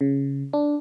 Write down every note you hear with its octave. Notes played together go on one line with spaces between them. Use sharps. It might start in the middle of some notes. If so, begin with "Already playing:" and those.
C#3
D4